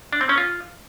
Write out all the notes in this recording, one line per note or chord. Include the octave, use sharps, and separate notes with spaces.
D4
C4
C#4
F4